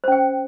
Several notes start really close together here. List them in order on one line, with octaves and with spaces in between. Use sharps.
C5 C#4 G5